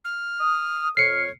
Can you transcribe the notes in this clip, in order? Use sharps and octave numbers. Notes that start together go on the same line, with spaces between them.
F6
D#6
F2 C#5 F6 C7 C#7